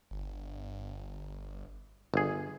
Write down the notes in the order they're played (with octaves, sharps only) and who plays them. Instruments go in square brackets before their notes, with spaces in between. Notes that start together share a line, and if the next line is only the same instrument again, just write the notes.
[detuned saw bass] G1
[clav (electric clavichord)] G1 G#4